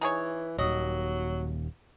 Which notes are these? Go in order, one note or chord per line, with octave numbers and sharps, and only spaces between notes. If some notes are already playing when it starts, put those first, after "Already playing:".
E3 D#4 G#4 C#5
D#1 D#2 F#3 D#5